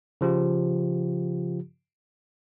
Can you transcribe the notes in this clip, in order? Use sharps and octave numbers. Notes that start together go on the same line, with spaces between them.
C#3 F3 F4 G4